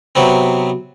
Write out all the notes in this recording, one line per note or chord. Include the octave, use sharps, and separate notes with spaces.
C3 F#3 B3 C4